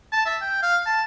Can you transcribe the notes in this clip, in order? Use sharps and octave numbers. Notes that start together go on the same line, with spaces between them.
A5
E5
G5
F5
A5